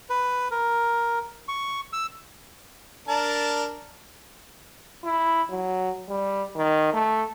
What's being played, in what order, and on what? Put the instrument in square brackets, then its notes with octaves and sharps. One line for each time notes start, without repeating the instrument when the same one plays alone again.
[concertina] B4
A#4
C#6
E6
[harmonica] D4 A#4 A5
[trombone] E4
F#3
G3
D#3
A3